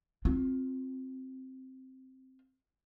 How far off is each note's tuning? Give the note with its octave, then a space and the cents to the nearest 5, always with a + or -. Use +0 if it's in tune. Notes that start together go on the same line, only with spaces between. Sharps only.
C4 +0 F4 +15